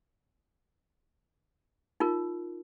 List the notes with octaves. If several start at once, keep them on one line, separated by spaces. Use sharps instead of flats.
D#4 F4 A#4